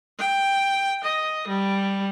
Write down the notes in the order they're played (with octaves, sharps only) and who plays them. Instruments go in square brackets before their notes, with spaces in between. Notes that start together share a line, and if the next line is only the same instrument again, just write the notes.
[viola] G5
D#5
G3